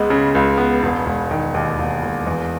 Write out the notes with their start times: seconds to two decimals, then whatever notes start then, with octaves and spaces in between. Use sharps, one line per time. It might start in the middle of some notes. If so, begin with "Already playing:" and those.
Already playing: C#2 G#3 B3
0.10 C#3
0.35 C#2
0.58 B3
0.83 E1
1.06 E1
1.31 D#3
1.54 D#2
1.79 E1
2.02 E1
2.27 E2